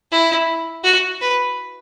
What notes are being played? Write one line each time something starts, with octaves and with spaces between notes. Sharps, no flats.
E4
F#4
B4